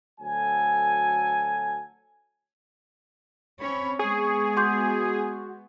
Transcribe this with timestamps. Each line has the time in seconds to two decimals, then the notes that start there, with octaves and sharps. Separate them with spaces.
0.21 D2 F#3 A4 G#5
3.60 C4 C#4 C#5 B5
3.99 G#3 B3 G#4 C#6
4.57 F#4 C6 D6 G6